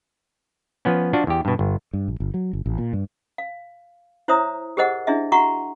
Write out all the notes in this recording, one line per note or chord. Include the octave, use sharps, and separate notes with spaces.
F3 B3 C#4
F3 D4 F4 F#4
E2 G4
G2 B2
G1
G2
A#1
G1
F#3
G1
A1
A#2
G2
F5
E4 C5 C#5 E5 A#5 D#6
G4 G#4 A#4 C5 D#5 F#5
D4 E4 G#4 D#5 E5
F#4 E5 F#5 A#5 C#6